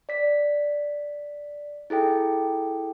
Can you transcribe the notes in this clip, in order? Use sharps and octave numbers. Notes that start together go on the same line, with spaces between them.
D5 B6
E4 G#4 A4 G5